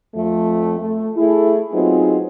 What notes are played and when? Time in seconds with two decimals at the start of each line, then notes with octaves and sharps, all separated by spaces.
0.16 F2 F3 A3
0.80 A3
1.17 A3 E4 G#4
1.72 F#3 B3 C4 D#4 F4 G#4